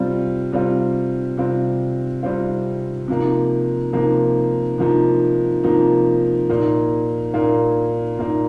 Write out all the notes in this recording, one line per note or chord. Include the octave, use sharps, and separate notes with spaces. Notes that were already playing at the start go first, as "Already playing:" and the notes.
Already playing: C3 G3 C4 F4
C3 G3 C4 F4
C3 G3 C4 F4
C3 G3 C4 F4
C3 F3 A#3 D#4
C3 F3 A#3 D#4
C3 F3 A#3 D#4
C3 F3 A#3 D#4
A#2 A#3 D#4
A#2 A#3 D#4
A#2 A#3 D#4